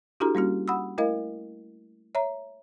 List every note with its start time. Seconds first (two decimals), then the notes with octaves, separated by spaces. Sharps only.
0.20 D4 E4 F#4 G4 A4 A#5
0.35 G3 A#3 C#4 F#4
0.68 F#5 B5 D#6 E6
0.98 A3 E4 A#4 D#5 F5
2.15 C#5 E5 A#5